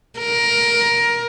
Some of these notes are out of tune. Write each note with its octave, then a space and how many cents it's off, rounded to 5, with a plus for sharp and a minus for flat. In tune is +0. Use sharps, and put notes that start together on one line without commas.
A#4 +15